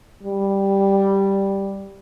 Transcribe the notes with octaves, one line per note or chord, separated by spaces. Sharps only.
G3